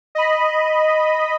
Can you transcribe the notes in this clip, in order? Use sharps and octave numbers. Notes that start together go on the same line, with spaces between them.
D#5 B5